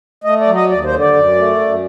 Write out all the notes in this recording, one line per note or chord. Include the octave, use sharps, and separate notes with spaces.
A3 D#5
D5
F#3
D#5
D#2 D5
C5
D3
D5
F#2
A3
F#2